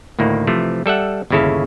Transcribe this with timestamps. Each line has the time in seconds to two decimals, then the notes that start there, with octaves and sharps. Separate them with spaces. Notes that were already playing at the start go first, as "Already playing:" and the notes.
0.19 D2 A2 D#3 A#3
0.47 C3 E3 F3 A3
0.86 G3 A4 E5 F#5
1.30 G1 D#2 C#3 E4 A4 F5